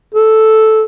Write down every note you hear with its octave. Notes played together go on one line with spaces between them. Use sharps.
A4